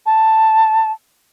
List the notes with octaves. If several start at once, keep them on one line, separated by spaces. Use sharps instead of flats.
A5